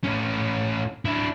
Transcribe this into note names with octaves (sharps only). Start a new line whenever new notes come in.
A2 C#4
D4 E4